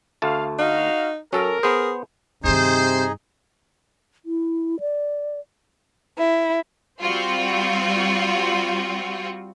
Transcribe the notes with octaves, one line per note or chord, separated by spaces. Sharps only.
D2 A3 F5 A5
D#4 F#4 F5
F#3 C#4 A4 A#4
B3 G#4 C5
G2 C3 D#3 D#4 G#4 C5 D#5
E4
D5
E4
G3 C4 F4 F#4